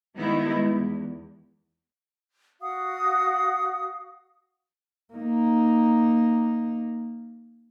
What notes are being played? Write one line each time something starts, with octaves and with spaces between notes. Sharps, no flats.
D#3 G3 G#3 B3 D#4 E4
E2
F#4 F5 F#5 D#6
A#3 D#4